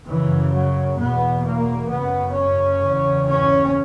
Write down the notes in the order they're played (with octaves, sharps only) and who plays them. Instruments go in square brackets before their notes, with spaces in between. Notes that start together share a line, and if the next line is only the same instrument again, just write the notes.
[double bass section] F#2 C#3 E3
F#3
E2 B2 B3
A#3
F#2 C#3 B3
C#4
E2 C#3
C#4